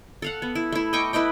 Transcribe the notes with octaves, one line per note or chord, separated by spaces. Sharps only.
A4 F5 F#5
B3
E4
A3 E4
D#5 G5 C#6 D6
E4 B4 D#5 G5